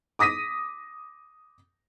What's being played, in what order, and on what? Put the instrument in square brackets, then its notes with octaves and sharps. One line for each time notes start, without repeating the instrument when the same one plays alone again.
[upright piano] D6 D#6 A#6 B6 D#7